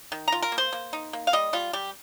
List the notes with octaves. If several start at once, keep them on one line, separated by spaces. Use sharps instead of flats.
D#3
F4 A#5
A#4
A#3
C5
A#3
D#4
A#3
F5
G3 D#5
G3 F4
G3 G4